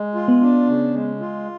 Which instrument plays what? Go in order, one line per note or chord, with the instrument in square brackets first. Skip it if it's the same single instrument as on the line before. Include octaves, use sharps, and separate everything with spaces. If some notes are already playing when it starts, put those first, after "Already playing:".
Already playing: [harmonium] G#3
F4
[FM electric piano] B3
[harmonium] D4
C#3
G#3
F4